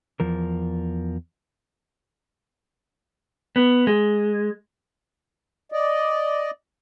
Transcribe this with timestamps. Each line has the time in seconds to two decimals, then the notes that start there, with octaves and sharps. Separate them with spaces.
0.20 E2 F3 A#4
3.56 B3
3.87 G#3
5.72 D5 D#5